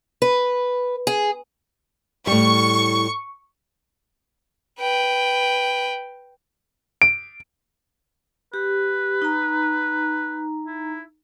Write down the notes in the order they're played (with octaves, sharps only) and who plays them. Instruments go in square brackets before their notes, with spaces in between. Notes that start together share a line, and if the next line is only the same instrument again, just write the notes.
[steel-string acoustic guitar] B4
G#4
[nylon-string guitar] A2 G3 [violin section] C#6
[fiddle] B4 G5
[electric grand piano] D7
[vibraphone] G4 [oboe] B4
[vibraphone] D#4 A#5
[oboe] E4